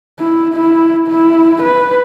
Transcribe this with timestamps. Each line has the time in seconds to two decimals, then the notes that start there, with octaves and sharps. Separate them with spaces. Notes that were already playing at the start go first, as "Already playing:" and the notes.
0.20 E4
0.54 E4
1.08 E4
1.62 B4